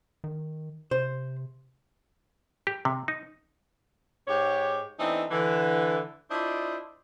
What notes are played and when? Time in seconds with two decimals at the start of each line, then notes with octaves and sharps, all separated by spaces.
0.24 D#3
0.91 C3 C5
2.67 G4
2.85 C3
3.08 D#4
4.28 G#2 G4 C#5
4.99 E3 A3 B3 C4 D4 D#4
5.31 D3 E3
6.29 D4 E4 F4 C5 D5 D#5